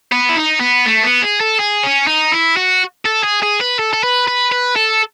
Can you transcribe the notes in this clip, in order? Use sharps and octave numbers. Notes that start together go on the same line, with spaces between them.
B3
E4
D#4
B3
A3
B3
G#4
A4
G#4
C#4
D#4
E4
F#4
A4
G#4
G#4
B4
A4
A4
B4
B4
B4
A4